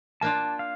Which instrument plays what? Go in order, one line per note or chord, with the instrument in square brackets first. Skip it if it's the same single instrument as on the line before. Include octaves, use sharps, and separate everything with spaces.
[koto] A#3 D4 F4 [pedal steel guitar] A5
[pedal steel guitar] F5